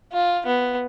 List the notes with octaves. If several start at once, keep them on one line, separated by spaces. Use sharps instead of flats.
F4
B3